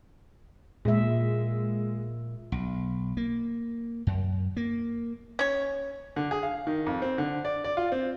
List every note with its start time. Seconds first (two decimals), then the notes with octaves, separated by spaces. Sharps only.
0.85 A#2 G#3 E5
2.52 B1
3.17 A#3
4.07 F#2
4.57 A#3
5.39 C#4 C#5
6.16 D3
6.31 G#4
6.43 F5
6.67 D#3
6.86 F2
7.02 C4
7.18 D3
7.45 D5
7.64 D5
7.77 F4
7.92 C4